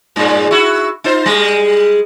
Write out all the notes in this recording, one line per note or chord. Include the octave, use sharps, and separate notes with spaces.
G2 A#2 G#3
E4 F#4
D#4 F4 C5
G3 G#3